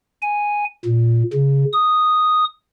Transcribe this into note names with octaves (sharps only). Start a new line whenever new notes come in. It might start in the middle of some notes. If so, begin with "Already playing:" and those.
G#5
A#2
C#3
D#6